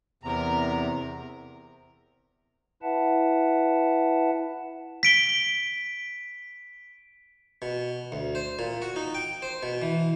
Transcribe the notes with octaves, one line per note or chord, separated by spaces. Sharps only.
E2 C3 A#4 A#5
E4 B4 E5 F#5 A5
B6 D7 G7
B2
D2
C5
A#2
F#4
D#4
G5
C5
B2
E3